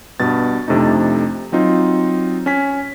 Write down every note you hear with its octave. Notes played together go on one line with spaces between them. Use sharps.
G2 B2 A6
F2 C3 A3 D4 D#4
F#3 C4 D#4 F4
C#4 G#5 B6